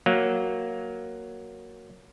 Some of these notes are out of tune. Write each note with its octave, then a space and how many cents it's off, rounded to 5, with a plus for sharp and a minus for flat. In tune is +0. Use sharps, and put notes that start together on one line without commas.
F#3 +0 A#3 +0